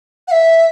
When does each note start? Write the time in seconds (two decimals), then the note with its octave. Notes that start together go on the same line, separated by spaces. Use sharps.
0.27 F#5
0.31 E5